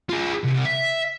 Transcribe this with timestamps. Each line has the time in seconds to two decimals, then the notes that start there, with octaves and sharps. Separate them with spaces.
0.09 F4 G#4
0.44 C2
0.65 E5